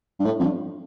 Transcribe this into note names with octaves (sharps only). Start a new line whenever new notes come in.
G2
A2
F2
G2